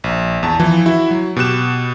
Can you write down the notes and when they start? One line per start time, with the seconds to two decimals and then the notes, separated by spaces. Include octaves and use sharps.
0.04 A#1
0.43 E2 A5
0.60 E3 F3
0.86 E4 F#4 E5
1.11 F#3
1.36 B2 G4 F#6 E7